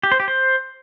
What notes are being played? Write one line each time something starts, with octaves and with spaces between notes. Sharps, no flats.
G4
C5
G4
C5